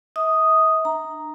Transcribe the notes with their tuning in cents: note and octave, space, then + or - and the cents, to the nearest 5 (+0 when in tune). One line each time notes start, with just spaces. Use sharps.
E5 -40 D#6 +0
D4 +40 A#5 +0